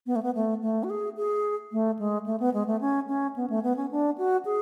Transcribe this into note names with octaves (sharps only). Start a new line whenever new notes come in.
B3
A3
B3
A3
A3
F#4
G#4
G#4
A3
G#3
A3
B3
G#3
A3
C#4
C#4
B3
A3
B3
C#4
D4
F#4
G#4